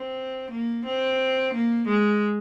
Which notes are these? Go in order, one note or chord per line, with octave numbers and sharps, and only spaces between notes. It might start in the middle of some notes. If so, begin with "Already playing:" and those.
Already playing: C4
A#3
C4
A#3
G#3